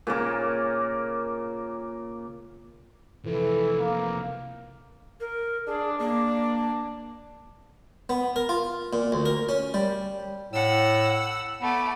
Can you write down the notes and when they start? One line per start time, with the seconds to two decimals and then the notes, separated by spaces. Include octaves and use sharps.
0.07 A#2 C#3 A#3 D6
3.25 C3 E3 F3 A4
3.79 A#3
5.20 A#4
5.67 D4 G#4
5.99 A#3 D4
8.09 B3
8.36 A#4
8.49 F4
8.93 A#2
9.12 D2
9.26 A#4
9.49 C#4
9.74 G3
10.53 A2 F#5 E6
11.62 A3 B3 D6